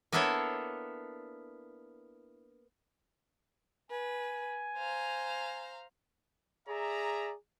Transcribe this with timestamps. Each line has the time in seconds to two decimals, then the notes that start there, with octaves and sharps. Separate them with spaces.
0.12 A#3 B3 D4 E4 A4 C#5
3.91 B4 G#5
4.76 C5 F5 A#5
6.68 G#4 D5 E5 A#5